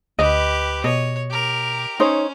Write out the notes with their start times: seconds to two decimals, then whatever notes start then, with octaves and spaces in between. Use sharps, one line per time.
0.19 D2 G4 B4 D#5
0.84 B2 C#5 D#5
1.30 G4 A#4
2.00 C#4 D#4 C5 C#5